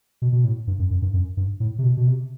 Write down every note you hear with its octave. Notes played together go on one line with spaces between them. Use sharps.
B2
B2
A2
G2
F#2
F#2
G2
F#2
G2
A2
C3
B2
B2
C3